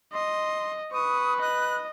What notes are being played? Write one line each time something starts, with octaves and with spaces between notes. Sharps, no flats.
D#5 C6
B4 C#6 D#6
D#5 F#6